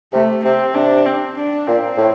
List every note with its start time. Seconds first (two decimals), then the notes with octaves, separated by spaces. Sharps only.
0.13 C3 A3
0.44 C3 C4
0.74 C3 D4
1.06 C4
1.37 D4
1.67 A#2 C4
1.97 A2